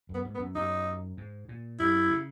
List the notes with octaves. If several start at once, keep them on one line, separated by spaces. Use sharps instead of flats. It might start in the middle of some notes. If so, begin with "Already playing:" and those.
F#2 B3
G#2
B3
F#2
F#2 D#4
G#2
A#2
F#2 E4
C#3